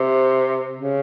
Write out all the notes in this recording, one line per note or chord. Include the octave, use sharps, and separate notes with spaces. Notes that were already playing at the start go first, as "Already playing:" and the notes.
Already playing: C3
C#3